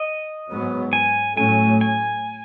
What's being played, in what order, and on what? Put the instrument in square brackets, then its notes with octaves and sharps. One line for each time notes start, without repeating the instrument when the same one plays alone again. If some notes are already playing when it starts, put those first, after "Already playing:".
Already playing: [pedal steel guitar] D#5
[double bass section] G#2 F#3 B3
[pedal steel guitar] G#5
[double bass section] A2 F#3 A3 C#4 [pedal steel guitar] G#5
[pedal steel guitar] G#5